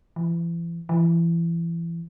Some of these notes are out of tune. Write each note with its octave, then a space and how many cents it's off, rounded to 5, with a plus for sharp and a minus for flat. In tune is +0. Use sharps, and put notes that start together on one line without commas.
E3 +40
E3 +30